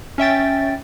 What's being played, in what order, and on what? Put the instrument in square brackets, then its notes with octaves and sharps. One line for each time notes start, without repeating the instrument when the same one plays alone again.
[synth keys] C#4 E5 G5 A6